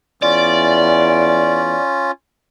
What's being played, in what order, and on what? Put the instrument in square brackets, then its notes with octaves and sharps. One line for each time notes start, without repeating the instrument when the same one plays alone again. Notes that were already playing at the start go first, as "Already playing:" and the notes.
[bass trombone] E2 [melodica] C#4 F4 [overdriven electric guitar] D5